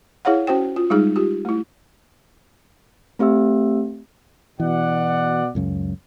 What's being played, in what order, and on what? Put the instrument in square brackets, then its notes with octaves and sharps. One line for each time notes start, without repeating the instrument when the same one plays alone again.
[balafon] E4 G#4 C#5 F5 F#5
C#4 F#4 C5 G5
F4
G3 G#3 D#4 G#4
F4 G4
A3 E4
[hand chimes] A3 C4 G4 E5 E6
[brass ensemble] B2 D5 F#5 [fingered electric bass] E3
[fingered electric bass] C#2 F#2 C#3